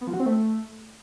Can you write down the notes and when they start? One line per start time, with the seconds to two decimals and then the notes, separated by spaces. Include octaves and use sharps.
0.01 B3
0.07 F3
0.14 F#4
0.20 C4
0.26 A3